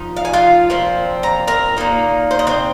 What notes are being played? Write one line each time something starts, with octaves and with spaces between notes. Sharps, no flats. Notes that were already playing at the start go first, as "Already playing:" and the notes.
Already playing: F3 D#4
F5
G#5
F4 F5
A#2 F3 C4
A#5
A#4 A#5
A#2 A#3 D#4
C5
D#5
C4 C5